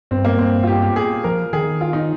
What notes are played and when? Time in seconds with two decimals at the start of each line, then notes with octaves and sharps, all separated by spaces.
0.11 G2 C4
0.25 A#3
0.38 C4
0.63 F4
0.67 G4
0.82 G4
0.96 G#4
1.24 F3 A#4
1.53 D#3 G#4
1.81 F4
1.93 D#4